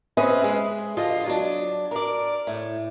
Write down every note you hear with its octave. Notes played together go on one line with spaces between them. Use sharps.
C4 C#4 G#4 B4 D#5 E5
G#3
D3 F3 F4 D#5
F#3 D4
A#4 D5
A2